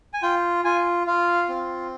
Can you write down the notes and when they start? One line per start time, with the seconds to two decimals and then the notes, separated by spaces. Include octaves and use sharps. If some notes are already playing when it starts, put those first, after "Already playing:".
0.14 G#5
0.22 F4 G5
0.64 F4 G#5
1.07 F4 F5
1.49 C4